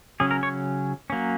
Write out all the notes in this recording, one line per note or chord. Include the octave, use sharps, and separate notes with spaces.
C#3 F#3 C#4 G#4
A#4
C#5
F#3 A#3 C#4